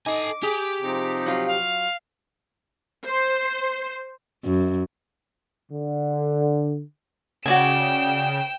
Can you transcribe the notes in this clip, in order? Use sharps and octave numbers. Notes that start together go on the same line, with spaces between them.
D#4 A4 G#5 D6
G4 G#4
C3 F3 D#4
F#3 F4
F5
C5
F#2
D3
C#3 F#4 D5 G5 G#5 E7